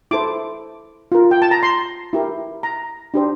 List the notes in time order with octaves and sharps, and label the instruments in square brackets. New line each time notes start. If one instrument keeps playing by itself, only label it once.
[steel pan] E4 A4 C5 D6
F4 A#4
G5
A5
A#5
C6
E4 G4 A#4
A#5
D4 G4 C5